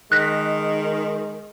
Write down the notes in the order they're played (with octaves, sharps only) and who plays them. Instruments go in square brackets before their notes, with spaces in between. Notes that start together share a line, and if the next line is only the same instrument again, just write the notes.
[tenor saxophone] D#3 [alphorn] G#3 [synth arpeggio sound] F#6 A#6 B6